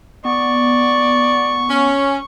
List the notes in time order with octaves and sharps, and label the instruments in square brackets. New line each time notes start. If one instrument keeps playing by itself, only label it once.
[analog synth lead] B3 [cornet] D5 [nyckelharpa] C#6
[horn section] C#4